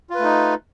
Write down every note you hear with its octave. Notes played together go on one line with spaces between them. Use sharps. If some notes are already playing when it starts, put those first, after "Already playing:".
A3 D#4 F4 B4